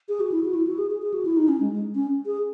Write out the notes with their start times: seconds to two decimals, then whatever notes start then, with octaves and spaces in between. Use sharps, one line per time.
0.09 G#4
0.20 F#4
0.32 E4
0.44 F#4
0.55 E4
0.67 F#4
0.78 G#4
0.91 G#4
1.02 G#4
1.14 F#4
1.25 E4
1.37 D#4
1.48 C#4
1.61 G#3
1.72 G#3
1.95 C#4
2.26 G#4